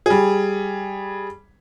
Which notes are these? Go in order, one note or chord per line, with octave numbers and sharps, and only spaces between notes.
G3 G#4